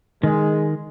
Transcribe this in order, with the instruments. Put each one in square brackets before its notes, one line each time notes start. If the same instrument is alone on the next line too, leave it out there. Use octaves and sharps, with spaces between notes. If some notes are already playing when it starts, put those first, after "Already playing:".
[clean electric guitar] D#3 [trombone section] G#3